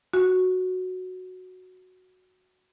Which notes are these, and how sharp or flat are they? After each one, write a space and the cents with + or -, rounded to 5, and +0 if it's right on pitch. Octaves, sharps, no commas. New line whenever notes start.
F#4 -5